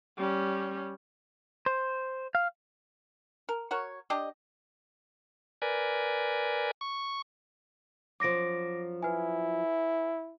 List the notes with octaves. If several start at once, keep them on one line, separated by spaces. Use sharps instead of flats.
G3 C#4
C5
F5
A#4
F#4 A#4 C#5
D4 G4 D#5
A#4 B4 D5 G#5
C#6
F#2 F3 D6 A#6 D7
E4 B4 G#5